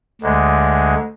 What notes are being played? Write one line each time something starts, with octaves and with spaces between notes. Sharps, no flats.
D2 D3 G#3